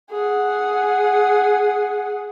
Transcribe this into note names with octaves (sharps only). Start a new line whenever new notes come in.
G#4 F#5